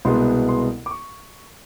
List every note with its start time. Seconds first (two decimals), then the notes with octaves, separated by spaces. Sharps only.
0.05 C2 B2 G#3 B3 C6
0.48 C6
0.86 D6
0.91 C#6